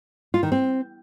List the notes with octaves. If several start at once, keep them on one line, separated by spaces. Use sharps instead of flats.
F4
D#3
C4